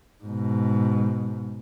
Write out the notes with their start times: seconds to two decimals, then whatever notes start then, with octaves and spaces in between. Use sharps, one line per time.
0.24 G#2 B2